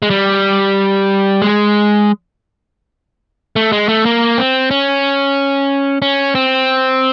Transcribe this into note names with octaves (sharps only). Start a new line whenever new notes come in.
G#3
G3
G#3
A3
G#3
A3
A#3
C4
C#4
C#4
C4